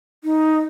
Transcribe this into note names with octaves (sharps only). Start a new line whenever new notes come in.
D#4